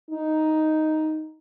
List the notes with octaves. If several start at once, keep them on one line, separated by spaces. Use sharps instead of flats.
D#4